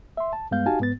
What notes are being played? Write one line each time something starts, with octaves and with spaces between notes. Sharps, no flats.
E5 C6
A5
G2 G#3 B3 F5 G6
D#4 F#4 G4 F5 G#5 A5
G#2 B3 A6